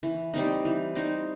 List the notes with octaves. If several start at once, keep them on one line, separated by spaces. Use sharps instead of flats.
E3
G3 C4 D#4
E3
G3 C4 D#4